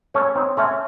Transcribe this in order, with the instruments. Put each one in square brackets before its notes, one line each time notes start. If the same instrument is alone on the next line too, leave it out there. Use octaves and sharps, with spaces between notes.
[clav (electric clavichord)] A3 C#4 [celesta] C#5
[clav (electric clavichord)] C4 D#4
[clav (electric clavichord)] A3 C#4 [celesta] E5 A5 C6